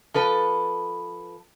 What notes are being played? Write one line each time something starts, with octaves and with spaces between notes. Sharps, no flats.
F3 A4 B4